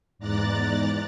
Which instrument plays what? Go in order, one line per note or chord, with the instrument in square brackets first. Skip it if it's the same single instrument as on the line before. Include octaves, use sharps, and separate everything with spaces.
[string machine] E2 G#2 D5 A#5 F#6 A6